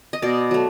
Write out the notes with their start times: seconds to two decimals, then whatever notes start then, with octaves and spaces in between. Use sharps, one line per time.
0.13 D#5
0.22 B2 D5
0.51 F#3 A3